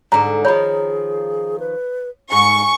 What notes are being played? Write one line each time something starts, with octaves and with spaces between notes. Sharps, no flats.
G#2 D3 A#5
D#3 F3 G#4 C#5 B5
B4
G#2 G#5 C#6